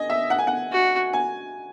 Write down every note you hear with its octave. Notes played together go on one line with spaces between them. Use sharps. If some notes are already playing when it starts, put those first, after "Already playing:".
Already playing: D#5 G#5
E5
F#5
G#5
F#5
F#4
G#5